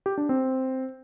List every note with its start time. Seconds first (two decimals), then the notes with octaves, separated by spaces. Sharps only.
0.06 G4
0.18 D4
0.29 C4